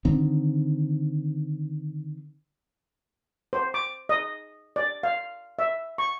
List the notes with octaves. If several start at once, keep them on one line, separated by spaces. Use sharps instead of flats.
D3 D#3 C4
C5
D6
D#5
D5
F5
E5
C#6